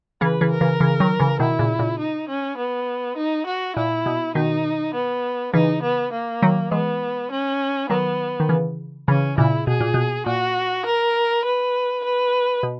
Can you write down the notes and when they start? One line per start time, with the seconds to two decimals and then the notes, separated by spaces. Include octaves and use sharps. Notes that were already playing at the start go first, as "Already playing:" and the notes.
0.21 C#3 E3 B4
0.41 C#3 E3
0.51 A#4
0.61 C#3 E3
0.80 C#3 E3
1.00 D#3 F#3
1.20 C#3 E3
1.40 B2 D#3 E4
1.59 A#2 C#3
1.79 A#2 C#3
1.99 D#4
2.29 C#4
2.58 B3
3.17 D#4
3.46 F#4
3.76 A#2 E4
4.06 B2
4.35 B2 D#3 D#4
4.94 B3
5.53 C#3 E3 D#4
5.82 B3
6.13 A#3
6.42 D#3 F#3
6.71 E3 G#3 B3
7.31 C#4
7.90 D#3 F#3 B3
8.40 D#3
8.49 C#3 E3
9.08 C#3 E3 C#4
9.38 A#2 C#3 E4
9.67 B2 G#4
9.80 A#2
9.94 B2
10.26 A#2 F#4
10.86 A#4
11.45 B4
12.04 B4
12.63 B2